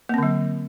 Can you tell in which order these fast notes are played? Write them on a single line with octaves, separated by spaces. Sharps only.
A#3 C4 D3 F#3